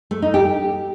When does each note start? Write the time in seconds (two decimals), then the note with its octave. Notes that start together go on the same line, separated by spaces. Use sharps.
0.11 A3
0.22 D#4
0.34 G4